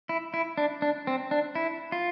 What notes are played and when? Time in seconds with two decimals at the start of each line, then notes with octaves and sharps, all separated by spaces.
0.09 E4
0.34 E4
0.58 D4
0.82 D4
1.07 C4
1.31 D4
1.55 E4
1.92 F4